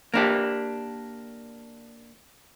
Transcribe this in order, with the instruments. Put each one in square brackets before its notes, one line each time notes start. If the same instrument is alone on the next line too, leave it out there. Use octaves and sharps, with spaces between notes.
[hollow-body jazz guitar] A#3 D4 G4